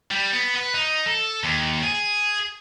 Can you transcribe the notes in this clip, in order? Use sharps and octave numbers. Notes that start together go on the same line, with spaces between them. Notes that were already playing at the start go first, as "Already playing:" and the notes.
G3
B3
B4
D#4
A4
D#2
G#4